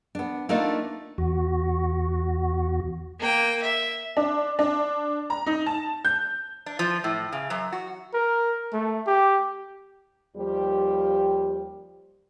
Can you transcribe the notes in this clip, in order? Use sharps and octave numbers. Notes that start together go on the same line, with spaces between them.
B3 D4
A3 A#3 D4 D#4 F4
E2 F#4
A#3 G5
E5
D4
D4
A#5
D#4
A5
G6
D4
F3
A2
C#3
F#2
F#4
A#4
A3
G4
D#2 F3 G3 G4